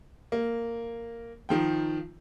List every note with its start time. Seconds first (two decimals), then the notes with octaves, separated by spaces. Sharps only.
0.32 A#3
1.49 D#3 F3 G5